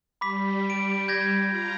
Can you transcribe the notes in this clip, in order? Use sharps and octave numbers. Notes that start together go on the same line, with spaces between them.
G3 B5 D6 B6
D7
G6 G#6 A#6
F4 A#5